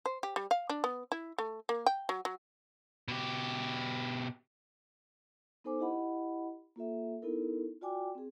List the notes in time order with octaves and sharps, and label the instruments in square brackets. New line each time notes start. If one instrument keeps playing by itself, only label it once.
[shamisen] C5
G4
G3
F5
D4
B3
E4
A3
A#3
G5
F#3
F#3
[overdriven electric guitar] B2 G4
[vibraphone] B3 D#4 A4 C5 G#5 D6
E4 G4 D#5 F#5 B5
A#3 F4 A4 E5
B3 D#4 E4 A4 A#4
F4 F#4 D5 G5 G#5 D6
C4 G#4